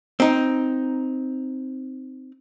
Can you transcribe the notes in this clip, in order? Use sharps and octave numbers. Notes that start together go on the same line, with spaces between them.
C4 D#4